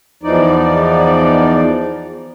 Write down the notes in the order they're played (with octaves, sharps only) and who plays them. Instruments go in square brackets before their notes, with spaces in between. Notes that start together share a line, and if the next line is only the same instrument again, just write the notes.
[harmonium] E2 E3 F3 D#4 D5